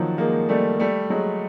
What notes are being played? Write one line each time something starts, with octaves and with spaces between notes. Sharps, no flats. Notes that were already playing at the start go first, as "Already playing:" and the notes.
Already playing: D#3 F3 F#3
G#3 A#3
G3 A3
G3 A3
F#3 G#3